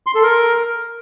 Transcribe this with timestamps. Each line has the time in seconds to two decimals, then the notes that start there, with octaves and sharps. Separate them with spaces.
0.07 C6
0.15 A4
0.23 A#4